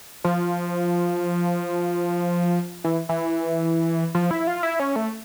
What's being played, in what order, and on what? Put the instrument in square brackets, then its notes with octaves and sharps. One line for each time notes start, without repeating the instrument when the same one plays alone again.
[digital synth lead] F3
E3
E3
F3
E4
F4
E4
C#4
A3